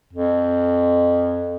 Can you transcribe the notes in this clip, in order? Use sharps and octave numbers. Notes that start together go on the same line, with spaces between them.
F2